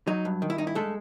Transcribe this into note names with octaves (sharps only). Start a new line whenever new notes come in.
F#3 D#4
G2
D#3
E4
G2 D#4
E4
G#3 A3 A4